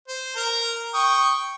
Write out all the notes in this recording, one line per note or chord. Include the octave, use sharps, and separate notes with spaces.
C5
A#4 A#5
G5 C#6 D#6